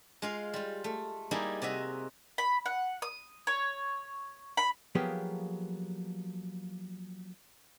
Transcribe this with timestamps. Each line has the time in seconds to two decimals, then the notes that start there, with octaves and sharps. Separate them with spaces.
0.22 G#3 F4 F5
0.53 G3 F4
0.84 A3
1.31 G3 A#3 D#4 E4 G4 G#4
1.62 C3 F#4 D#5 E5
2.38 B5
2.66 F#5
3.02 D#6
3.47 C#5
4.57 B5
4.95 F3 F#3 A#3 B3 G4 G#4